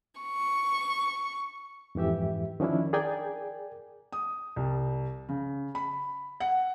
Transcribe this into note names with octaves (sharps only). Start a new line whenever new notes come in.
C#6
F2 G#2 E3 G4 E5
D#3 F3 C#4 D4 E4
G#4 A#4 D5 G5 G#5
D#6
C2
C#3
B5
F#5